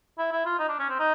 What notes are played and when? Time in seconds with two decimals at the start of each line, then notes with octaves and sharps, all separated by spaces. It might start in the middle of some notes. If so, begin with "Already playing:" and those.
0.18 E4
0.32 E4
0.46 F4
0.59 D#4
0.69 D4
0.79 C#4
0.89 C4
0.99 D#4